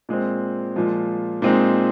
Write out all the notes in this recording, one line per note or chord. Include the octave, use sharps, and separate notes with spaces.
A#2 G#3 C4
A#2 F3 G#3
A#2 G#3 C4 D#4